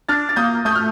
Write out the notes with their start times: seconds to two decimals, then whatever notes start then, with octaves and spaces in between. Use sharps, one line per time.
0.09 D4 F6 A6
0.29 A6
0.36 A#3 D#6 G6
0.65 A3 D#6 G6
0.75 F6